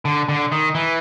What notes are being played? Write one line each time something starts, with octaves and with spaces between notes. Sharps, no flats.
D3
D3
D#3
E3